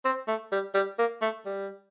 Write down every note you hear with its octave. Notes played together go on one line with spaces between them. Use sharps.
C4
A3
G3
G3
A#3
A3
G3